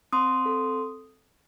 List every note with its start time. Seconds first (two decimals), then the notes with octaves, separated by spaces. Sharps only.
0.13 C4 C6 D#6
0.46 A4